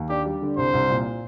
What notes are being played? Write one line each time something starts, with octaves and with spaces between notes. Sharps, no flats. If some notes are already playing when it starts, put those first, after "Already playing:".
Already playing: D#2
D4 G4
G3
D3
C2 C5
C2
A#2